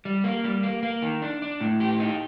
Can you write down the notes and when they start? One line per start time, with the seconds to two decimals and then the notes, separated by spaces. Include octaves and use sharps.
0.05 G3
0.24 A#3
0.44 G3
0.63 A#3
0.83 A#3
1.02 D#3
1.22 D4
1.42 D4
1.60 A2
1.80 G4
2.00 D#4